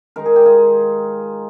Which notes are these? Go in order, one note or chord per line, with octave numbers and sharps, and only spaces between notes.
D#3 G#3 D#4 A#4
G#4
G4
F4 G#4